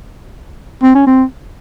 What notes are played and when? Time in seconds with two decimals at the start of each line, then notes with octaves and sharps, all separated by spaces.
0.83 C4
0.95 C#4
1.07 C4